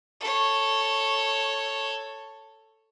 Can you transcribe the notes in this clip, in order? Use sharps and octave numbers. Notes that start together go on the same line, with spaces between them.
A4 C#5